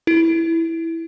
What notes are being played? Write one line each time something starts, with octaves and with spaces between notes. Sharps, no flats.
E4